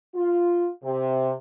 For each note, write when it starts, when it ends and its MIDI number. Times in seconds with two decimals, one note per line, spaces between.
0.15 0.69 65
0.84 1.34 48